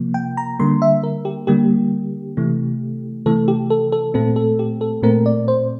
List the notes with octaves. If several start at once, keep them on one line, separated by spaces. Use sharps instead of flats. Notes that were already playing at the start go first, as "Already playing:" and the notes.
Already playing: C3 F3 A#3
G5
A#5
D3 G3 A#3 C6
E5
A#4
G4
D3 G3 A#3 G4
C3 E3 A3
C3 E3 A3 A4
G4
A4
A4
A#2 A3 C4 A4
A4
G4
A4
A#2 A3 C4 A#4
D5
C5